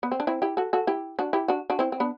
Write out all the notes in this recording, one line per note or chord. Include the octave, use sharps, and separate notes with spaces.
B3
C4
D4
C4 E4
E4 G4
F#4 A4
F#4 A4
E4 G4
D4 F#4
E4 G4
D4 F#4
D4 F#4
C4 E4
C4
B3 D4